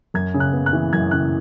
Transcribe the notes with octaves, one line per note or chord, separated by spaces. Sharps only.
F#2 G#6
C#3
F#6
B3
F#6
E3
F#2 G#6
C#3 F#6